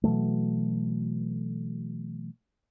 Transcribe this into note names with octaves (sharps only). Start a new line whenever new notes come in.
B2 E3 F#3 A3